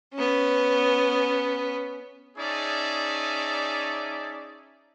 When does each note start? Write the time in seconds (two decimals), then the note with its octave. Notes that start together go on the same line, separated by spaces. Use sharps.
0.14 B3 C#4
2.38 C#4 D#4 G#4 D5 E5 A5